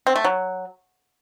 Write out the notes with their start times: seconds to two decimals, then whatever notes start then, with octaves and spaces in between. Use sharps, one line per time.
0.07 C4
0.16 A3
0.25 F#3